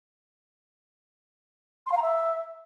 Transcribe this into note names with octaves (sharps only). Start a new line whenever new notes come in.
C6
F5
A#5
E5